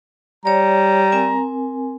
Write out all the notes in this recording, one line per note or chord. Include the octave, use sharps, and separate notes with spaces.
G3 C#5 D5 A#5
C4 A#4 G#5